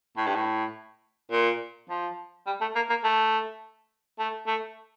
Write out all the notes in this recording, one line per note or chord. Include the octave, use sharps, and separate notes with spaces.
A2
G2
A2
A#2
F3
G3
A3
A#3
A#3
A3
A3
A3